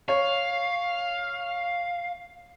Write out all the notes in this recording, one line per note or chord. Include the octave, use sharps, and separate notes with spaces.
C#5 F5